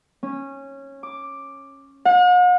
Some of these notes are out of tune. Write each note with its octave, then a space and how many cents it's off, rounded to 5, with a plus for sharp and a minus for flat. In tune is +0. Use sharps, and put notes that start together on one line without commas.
C#4 -15
D6 +5
F#5 -45